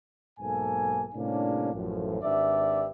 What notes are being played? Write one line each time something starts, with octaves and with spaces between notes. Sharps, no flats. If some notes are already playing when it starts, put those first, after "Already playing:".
B1 G#2 A#3 A4 G#5
A2 C3 G3 A#3 C#4 D4
A1 F#2 A2 F3
G#1 D4 G4 B4 D5 E5